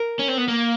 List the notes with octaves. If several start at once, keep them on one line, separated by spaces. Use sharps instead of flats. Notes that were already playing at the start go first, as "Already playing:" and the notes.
Already playing: A#4
C#4
C4
B3
A#3